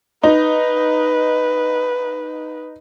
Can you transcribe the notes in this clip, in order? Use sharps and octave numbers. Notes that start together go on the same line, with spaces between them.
D#4 B4